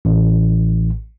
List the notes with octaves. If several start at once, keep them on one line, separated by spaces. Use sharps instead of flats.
A1